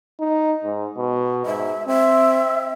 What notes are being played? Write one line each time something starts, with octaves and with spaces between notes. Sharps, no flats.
D#4
G#2
B2
G#2 E5
C4 E5